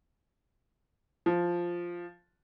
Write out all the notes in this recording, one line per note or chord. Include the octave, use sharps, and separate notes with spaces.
F3